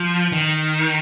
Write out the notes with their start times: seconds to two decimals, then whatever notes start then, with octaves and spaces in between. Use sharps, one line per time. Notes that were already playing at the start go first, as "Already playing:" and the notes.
Already playing: F3
0.32 D#3